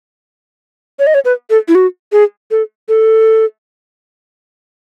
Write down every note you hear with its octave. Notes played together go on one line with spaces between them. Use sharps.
C#5
D#5
C#5
B4
A4
E4
F#4
G#4
A4
A4